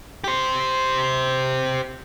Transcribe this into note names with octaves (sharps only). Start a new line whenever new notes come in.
G4 C5